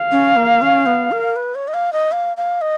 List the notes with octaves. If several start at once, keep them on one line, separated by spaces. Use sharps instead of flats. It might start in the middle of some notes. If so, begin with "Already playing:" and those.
Already playing: F5
C#4
A#3
C#4
B3
A#4
B4
C#5
D#5
F5
D#5
F5
F5
D#5